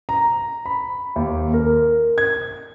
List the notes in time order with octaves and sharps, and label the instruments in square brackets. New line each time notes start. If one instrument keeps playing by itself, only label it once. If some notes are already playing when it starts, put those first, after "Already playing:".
[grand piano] A#5
B5
D#2
A#4
G#6